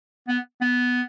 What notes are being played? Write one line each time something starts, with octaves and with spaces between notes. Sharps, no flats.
B3
B3